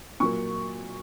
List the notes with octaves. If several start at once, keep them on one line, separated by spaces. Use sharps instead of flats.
A#2 F#3 A#3 C#6